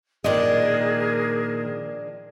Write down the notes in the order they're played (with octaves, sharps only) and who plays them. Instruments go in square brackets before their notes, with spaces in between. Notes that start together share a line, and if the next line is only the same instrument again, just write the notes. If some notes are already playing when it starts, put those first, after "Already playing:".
[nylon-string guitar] A#2 D#3 D#5 [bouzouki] F3 G#3 D4 [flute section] G#4 A#4